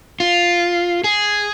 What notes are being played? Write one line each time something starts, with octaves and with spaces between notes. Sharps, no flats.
F4
G#4